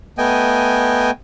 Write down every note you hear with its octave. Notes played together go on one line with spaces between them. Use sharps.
A3 B3 D#5 G5 G#5